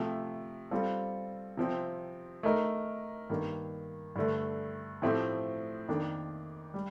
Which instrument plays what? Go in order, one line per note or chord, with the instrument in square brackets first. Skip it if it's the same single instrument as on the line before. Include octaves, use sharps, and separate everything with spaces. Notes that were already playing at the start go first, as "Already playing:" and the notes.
Already playing: [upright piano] C3 F3 A3
G3 C4 F4 A4
C3 F3 C4
A3 D#4 A#4
G2 D#3 A#3
G2 D3 A3
A2 F3 A3 C4 G4
F2 D#3 A#3 D4
G3